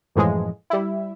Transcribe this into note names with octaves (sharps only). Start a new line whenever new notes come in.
F#2 A2 E3 F3 G#3
G3 E4